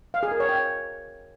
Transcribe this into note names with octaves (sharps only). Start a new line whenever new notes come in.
F5
G#4
A#4
C#5
G5